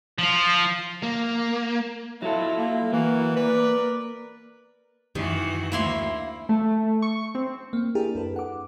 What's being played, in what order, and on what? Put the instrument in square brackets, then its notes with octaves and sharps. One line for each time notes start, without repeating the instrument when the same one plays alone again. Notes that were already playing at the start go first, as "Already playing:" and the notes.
[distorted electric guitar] F3 F4
[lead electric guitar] A#3
[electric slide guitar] F#3 A4 [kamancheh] E4 F4
[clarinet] A#3
[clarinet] E3 [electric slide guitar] A#3 [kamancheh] E4 F#4
[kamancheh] A#4 D5 [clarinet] B4
[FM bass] F#2 [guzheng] D#3 [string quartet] E3 F#4
[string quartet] D2 [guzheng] A#3 E4 C6
[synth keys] A3
C#6
C4
[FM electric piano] A#3 C4
D4 E4 G4 G#4 A#4 G5
F#2 A4 B4
F#5 D6